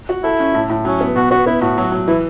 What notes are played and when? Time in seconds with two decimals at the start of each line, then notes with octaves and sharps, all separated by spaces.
0.09 F#4
0.23 E4 A4
0.40 C#4
0.54 A2
0.70 A2
0.85 F#3 C#4
1.01 B3
1.15 B2 F#4
1.31 B3 F#4
1.46 B3 E4
1.61 A2 F#4
1.77 F#3
1.92 F#3
2.07 E3 E4